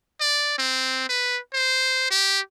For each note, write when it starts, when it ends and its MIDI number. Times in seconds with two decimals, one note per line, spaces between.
0.20 0.56 74
0.58 1.05 60
1.09 1.39 71
1.54 2.06 72
2.10 2.40 67